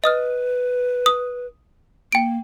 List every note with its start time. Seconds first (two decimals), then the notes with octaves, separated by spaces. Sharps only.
0.04 B4 D#5 D#6 F6
1.06 D#6
2.12 A#3 G5 D7